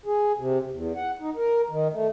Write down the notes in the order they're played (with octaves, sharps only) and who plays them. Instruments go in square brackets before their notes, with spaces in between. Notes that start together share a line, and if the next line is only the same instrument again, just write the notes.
[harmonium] G#4
C3
E2
F#5
D#4
A#4
D#3
A3